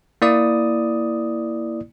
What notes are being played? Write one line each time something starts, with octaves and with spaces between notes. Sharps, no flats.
A#3 E4 D5 D#6